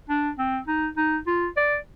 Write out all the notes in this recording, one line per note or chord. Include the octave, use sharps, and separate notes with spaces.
D4
C4
D#4
D#4
F4
D5